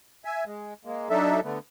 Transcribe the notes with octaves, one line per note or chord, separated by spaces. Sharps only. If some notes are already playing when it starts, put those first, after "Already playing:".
E5 G#5
G#3
G#3 A#3
F#3 D4 D#4 A4 E5
D3 A3 B3